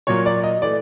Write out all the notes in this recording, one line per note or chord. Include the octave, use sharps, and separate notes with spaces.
A#2 F#3 A#3 C#5
D5
D#5
E3 A3 D5